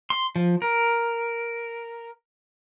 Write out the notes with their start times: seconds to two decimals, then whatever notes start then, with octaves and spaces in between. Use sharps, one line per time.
0.10 C6
0.36 F3
0.62 A#4